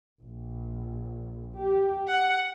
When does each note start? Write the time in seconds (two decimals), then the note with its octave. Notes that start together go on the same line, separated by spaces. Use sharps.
0.24 A#1
1.60 G4
2.10 F#5